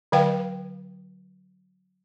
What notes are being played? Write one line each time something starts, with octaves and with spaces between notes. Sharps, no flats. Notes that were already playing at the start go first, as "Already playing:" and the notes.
D3 F#3 B4 F5 G5